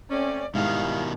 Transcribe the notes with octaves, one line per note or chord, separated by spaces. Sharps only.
A3 C4 C#4 D5
G#2 B2 D#3 G3 E4 F5